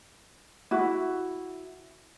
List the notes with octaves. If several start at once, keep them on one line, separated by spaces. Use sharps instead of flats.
E4 F#4